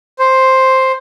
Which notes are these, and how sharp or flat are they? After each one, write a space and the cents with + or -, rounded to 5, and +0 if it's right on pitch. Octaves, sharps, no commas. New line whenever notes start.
C5 +5